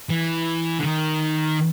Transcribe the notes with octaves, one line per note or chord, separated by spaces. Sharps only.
E3
D3
D#3